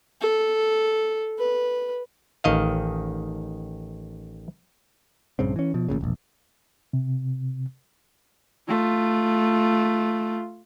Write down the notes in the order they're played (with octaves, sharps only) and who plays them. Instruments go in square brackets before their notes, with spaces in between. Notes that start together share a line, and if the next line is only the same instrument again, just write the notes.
[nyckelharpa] A4
B4
[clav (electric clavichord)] A1 D#3 D#5 F5
[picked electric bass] A#1 G2 C#3 C4
E3 C#4
B2 F3
A1 D#2 A#2 C#3
E1 A#1
[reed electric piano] C3
[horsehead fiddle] A3 F4